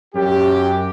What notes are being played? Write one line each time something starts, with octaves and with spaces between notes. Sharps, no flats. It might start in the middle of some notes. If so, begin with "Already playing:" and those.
F#2 G4